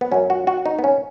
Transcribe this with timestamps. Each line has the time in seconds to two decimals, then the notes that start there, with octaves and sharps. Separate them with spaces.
0.01 B3
0.11 F#2 F#3 C#4
0.30 F#4
0.47 F#4
0.66 D#4
0.79 B3
0.84 C#4